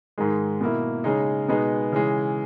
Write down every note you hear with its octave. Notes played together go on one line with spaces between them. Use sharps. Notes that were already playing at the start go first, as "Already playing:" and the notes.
G#2 D#3 G#3
B2 A#3 E4
C#3 G#3 D#4
B2 G#3 B3 D#4
C#3 E3 G#3